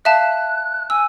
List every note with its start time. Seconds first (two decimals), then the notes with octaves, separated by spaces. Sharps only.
0.05 E5 F5 A5 F#6
0.90 G#5 E6